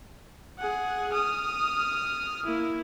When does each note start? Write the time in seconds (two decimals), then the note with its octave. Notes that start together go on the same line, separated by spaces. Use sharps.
0.58 G#4 F#5
1.13 D#6 F6
2.46 A#3 E4